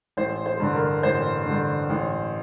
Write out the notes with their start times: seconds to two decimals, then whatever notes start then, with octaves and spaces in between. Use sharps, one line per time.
0.17 A1 C5
0.46 C5
0.60 G2 D3
0.75 A#4
1.03 A1 C5
1.46 G2 D3
1.90 A1